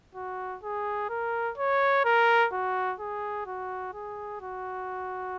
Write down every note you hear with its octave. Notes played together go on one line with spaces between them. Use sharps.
F#4
G#4
A#4
C#5
A#4
F#4
G#4
F#4
G#4
F#4